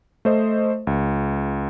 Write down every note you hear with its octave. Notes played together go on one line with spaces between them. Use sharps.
A3 C5 D#5
C#2